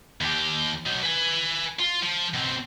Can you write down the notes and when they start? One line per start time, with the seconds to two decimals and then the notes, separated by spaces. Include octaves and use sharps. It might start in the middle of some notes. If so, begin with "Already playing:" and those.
0.21 D#2 G4
0.86 F#3 D#4
1.03 B4 G#5
1.79 F4
2.03 F3
2.34 B2 C4